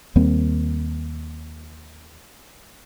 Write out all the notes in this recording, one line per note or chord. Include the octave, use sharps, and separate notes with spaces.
D#2 G3 A#3 C4